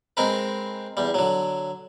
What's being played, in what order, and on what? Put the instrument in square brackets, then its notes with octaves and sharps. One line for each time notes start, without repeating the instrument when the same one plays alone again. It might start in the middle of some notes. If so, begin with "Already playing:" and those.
[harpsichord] G#3 C4 A#4 B4
E2 G3
D3 F#3